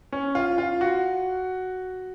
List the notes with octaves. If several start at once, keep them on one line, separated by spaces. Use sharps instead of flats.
C#4
F4
F4
F#4